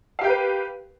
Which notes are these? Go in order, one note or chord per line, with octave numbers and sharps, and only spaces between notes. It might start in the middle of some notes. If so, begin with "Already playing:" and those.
G4 A#4 B4 F5 G5